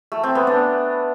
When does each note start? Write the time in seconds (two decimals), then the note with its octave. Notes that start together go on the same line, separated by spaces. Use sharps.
0.12 A3
0.23 C4
0.35 B3
0.47 D4